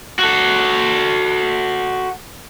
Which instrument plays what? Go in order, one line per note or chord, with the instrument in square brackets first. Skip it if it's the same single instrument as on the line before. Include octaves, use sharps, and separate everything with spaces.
[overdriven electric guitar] F#4 A4